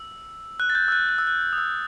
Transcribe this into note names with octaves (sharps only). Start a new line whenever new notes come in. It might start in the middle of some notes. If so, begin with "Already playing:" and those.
Already playing: E6
F#6
A6
G6
E6
F#6
F#6
E6
F#6
D#6
E6